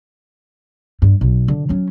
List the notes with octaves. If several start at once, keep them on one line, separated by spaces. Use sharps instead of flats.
G2
B1
D3
F#3 C#4